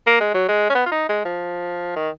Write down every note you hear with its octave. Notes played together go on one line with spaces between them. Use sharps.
A#3
G#3
F#3
G#3
C#4
B3
F4
D#4
G#3
F3
D#3